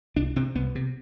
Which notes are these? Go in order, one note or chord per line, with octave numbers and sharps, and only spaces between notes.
C2 D4
C3 C4
C2 B3
C3